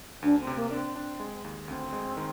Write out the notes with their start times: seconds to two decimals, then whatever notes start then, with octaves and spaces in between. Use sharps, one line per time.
0.22 D2 D4
0.40 C4
0.47 C3
0.55 A#3
0.71 C4 D4
0.96 D4
1.20 G#3
1.44 D#2
1.68 D2 C4
1.93 G#3
2.17 D#3